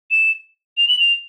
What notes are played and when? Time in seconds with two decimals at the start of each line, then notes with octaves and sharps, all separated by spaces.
0.11 E7
0.77 F7
0.88 F#7
0.99 F7